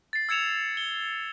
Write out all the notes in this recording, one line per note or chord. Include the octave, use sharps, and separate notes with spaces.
A6 C7
E6 G#6 C#7 E7 F7
G7